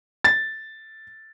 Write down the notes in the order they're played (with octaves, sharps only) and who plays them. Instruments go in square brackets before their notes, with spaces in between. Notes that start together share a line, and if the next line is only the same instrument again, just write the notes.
[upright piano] A6